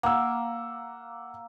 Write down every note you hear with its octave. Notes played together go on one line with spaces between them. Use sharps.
A#3 F#5 E6